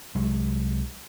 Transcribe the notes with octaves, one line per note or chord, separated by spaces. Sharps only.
C2 F#3 G#3